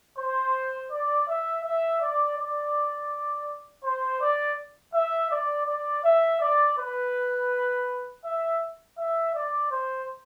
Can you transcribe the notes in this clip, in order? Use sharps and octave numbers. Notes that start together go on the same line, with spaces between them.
C5
D5
E5
E5
D5
D5
C5
D5
E5
D5
D5
E5
D5
B4
E5
E5
D5
C5